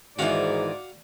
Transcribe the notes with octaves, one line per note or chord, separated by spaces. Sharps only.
G#2 D#3 E3 F#4 D5 F5 F#5